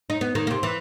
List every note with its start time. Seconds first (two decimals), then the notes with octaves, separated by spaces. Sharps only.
0.10 D#4
0.21 B3
0.35 D#3 A#3
0.47 C3 A#3
0.63 E3